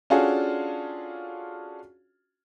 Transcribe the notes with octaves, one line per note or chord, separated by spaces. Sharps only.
C#4 D4 F4 F#4 G#4 A4